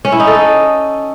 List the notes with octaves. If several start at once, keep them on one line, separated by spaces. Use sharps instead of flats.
C#4
E4
D#4
A4
D#5